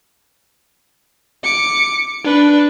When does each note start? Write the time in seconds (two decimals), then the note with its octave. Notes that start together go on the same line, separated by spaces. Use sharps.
1.44 D6 C#7
2.24 D4 B4